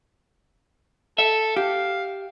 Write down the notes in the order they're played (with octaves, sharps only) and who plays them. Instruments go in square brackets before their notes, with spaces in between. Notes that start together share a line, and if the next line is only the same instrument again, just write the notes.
[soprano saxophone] A4 [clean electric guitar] E5
[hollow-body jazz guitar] G4 [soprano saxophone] F5